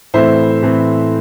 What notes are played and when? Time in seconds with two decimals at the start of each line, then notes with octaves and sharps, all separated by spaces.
0.14 A2 E3 A3 C4 C5 E5
0.62 A2 E3 A3 C4